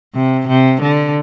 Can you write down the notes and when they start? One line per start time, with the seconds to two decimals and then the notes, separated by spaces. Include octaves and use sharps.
0.15 C3
0.48 C3
0.82 D3